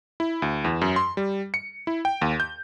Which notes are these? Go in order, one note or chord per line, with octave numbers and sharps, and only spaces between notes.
E4
D2
E2
F#2
C6
G3
C#7
E4
G5
D#2
G6